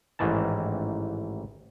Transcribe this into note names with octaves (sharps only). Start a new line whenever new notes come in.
A1 G#2 D#3 E3 A5